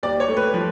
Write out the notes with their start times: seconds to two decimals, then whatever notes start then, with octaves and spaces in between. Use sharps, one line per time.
0.03 D#2 D5
0.20 C#5
0.28 A3
0.37 B4
0.54 F3